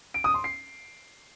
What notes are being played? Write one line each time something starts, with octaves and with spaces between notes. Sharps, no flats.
D7
D#6
C6
C7